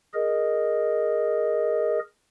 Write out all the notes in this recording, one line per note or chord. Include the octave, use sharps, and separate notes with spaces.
G#4 A#4 D#5